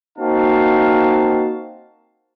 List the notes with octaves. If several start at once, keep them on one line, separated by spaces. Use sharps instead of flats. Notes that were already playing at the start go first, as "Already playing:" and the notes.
A#3 C4 D#4 F#4 F5 A5